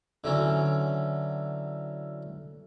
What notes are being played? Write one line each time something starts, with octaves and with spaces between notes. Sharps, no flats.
D3 E3 F#3 C#4